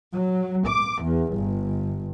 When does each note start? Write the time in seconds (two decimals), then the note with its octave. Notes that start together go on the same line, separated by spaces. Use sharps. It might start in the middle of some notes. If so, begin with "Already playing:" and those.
0.14 F#3
0.66 D6
1.03 E2
1.35 G1